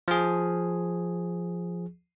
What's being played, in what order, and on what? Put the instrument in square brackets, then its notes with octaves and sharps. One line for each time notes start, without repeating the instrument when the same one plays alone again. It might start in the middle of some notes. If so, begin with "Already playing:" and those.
[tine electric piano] F3 G#4